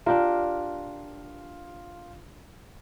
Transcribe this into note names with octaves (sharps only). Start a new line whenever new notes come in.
D4 F4 G4 A#4